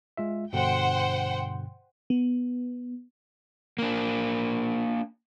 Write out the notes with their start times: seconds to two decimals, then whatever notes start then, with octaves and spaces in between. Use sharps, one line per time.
0.17 G#3 F4 E5
0.53 G2 B2 D3 C5 F#5 G5
2.10 B3
3.79 A#3 D4